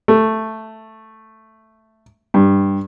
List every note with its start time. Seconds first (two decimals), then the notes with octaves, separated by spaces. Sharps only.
0.08 A3
2.34 G2